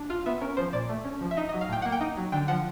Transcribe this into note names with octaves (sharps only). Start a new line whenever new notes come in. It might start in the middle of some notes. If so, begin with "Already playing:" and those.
Already playing: D4
F4 F5
B3 E5
C#4 A#4
F3 C5
A#2 D5
A3
C#4
F3
E5
D#4 D#5
F#3 D#5
F5
A2 G5
A#3 F#5
G5
D#4
F#3
D3 G5
F3 F#5